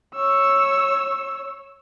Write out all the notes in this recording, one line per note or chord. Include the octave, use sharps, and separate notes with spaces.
C#5 E6